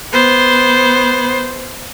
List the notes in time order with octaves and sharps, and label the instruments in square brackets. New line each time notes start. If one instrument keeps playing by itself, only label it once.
[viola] B3 C5